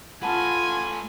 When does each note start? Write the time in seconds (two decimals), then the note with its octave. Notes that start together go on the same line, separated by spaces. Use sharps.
0.23 A3 F4 B4 F#5 G#5 A5